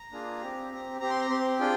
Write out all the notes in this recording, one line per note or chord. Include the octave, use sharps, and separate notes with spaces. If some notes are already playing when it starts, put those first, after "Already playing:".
Already playing: A#5
A#3 D4 F4 G#4
C4 G4
C4 G4
C4 G4 A#5
C6
A#5
C4 G4 C6
D4 F4 G#4 G5